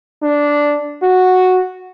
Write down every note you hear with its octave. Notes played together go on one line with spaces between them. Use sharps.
D4
F#4